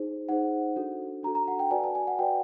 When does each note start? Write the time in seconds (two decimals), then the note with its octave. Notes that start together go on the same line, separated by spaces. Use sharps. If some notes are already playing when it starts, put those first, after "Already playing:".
Already playing: D#4 G#4 C5
0.29 D#4 G#4 C5 F#5
0.76 D4 F#4 A4
1.23 D4 F#4 A4 A#5
1.35 A#5
1.48 F#5
1.59 G5
1.71 F#4 B4 D5 G#5
1.84 A5
1.95 G#5
2.07 F#5
2.19 F#4 B4 D5 G5